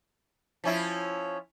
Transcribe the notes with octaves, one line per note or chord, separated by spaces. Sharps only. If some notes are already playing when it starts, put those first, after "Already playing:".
F3 C#4 E4